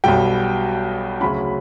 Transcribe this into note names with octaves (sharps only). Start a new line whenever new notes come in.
B1 B2 G3 G5
D2 C#3 F#3 C#4 B5